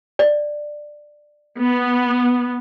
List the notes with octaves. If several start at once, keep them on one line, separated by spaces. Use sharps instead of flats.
D5
B3